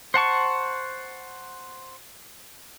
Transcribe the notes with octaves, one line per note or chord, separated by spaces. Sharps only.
C5 F#5 A5 C#6